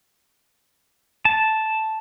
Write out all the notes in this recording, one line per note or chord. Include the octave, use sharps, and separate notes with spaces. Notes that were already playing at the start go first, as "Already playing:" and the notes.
A5